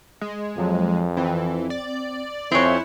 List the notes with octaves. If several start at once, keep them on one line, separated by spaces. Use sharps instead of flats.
G#3
F2 F3 F#3
E3 C4
D5
F2 C4 E4 C#5 E5 G#5 F#6